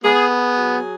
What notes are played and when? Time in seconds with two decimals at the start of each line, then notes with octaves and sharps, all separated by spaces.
0.04 G#3 B3 G#4
0.30 G#4
0.57 F#3